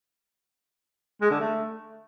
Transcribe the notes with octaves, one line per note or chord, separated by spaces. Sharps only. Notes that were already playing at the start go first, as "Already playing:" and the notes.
G#3
D3
A3